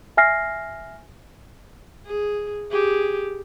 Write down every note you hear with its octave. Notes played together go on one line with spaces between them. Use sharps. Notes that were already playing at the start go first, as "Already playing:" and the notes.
E5 G#5 F6 A#6 C7
G#4
G4 G#4